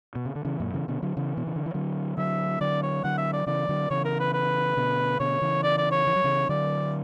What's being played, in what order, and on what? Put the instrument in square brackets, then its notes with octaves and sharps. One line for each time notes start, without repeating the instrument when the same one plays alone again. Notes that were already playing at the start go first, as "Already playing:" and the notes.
[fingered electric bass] B2
C#3
D3
C#3 E3
F#2 A#2
C#3 E3
B2 D3
D3 F#3
C#3 E3
B2
C#3
D3
E3
D3 F#3
[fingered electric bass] D3 F#3 [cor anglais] E5
[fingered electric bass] D3 F#3 [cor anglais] D5
[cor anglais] C#5
[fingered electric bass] D3 F#3 [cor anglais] F#5
[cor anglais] E5
D5
[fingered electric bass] C#3 E3 [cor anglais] D5
[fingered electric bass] D3 F#3
[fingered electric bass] C#3 E3 [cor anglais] C#5
[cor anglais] A#4
B4
B4
[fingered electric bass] B2 D3
[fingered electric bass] B2 D3 [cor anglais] C#5
[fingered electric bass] C#3 E3
[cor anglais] D5
D5
C#5
[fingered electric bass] E3
F#3
C#3 E3
[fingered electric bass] D3 F#3 [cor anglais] D5